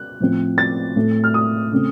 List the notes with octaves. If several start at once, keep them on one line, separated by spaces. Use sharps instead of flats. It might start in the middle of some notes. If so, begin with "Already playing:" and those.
Already playing: F#6
A2 F3 C4
A6
A2 A3 C4
F6
D#6
C#3 A3 C4